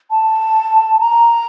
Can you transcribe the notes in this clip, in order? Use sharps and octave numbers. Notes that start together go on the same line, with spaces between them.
A5
A#5